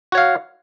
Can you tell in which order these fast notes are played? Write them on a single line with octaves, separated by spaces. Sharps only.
F#4 C#5 F5